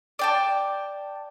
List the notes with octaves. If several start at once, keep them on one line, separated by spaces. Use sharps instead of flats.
D5 G5 A5